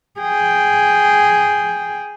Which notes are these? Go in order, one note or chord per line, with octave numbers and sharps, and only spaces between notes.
G#4 G5